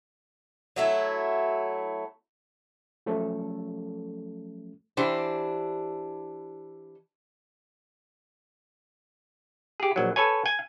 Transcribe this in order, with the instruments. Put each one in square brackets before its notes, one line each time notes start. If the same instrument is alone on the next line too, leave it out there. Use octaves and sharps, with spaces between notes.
[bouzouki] F#3 A3 E4
[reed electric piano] F3 F#3 A3 C#4 A4
[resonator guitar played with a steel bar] E3 D4 G4 C5
[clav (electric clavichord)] G4 G#4
A#1 F#3
A4 B4 C#5 G#5
G#5